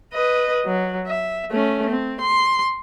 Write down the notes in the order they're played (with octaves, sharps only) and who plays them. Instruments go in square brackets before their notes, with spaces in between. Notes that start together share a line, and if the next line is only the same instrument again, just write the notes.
[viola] B4 D#5
F#3
E5
A3 C#4
C4
C6